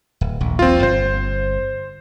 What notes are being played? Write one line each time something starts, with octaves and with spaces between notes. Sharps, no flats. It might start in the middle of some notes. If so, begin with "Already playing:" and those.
D1
D#1 A#1
C4 F4
G1 C5